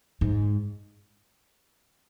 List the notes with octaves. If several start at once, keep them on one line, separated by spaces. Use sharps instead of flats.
G#2